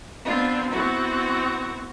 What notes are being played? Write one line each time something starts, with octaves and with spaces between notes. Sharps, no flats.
B3 C4 D4 F4
B3 C4 E4 F#4